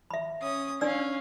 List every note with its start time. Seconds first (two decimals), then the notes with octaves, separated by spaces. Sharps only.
0.11 E5 B5
0.42 C#4 D#6
0.81 C#4 D4 D5 F5 E6